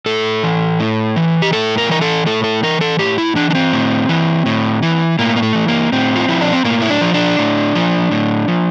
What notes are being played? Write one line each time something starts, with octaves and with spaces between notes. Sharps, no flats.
A2 A4
E3
A2
E3
G4
A2 A4
A#4
E3 A#4
A4
A2 A4
A4
E3 A#4
A4
A2 G4
E4
E3 D4
D4
C4
A2
E3
A2
E3
A2 A#3
A#3
A3
E3
A#3
A2 C4
F4
F3 E4
D4
C4
A2 A#3
E4
D4
F3
D4
A2
F3
A2
F3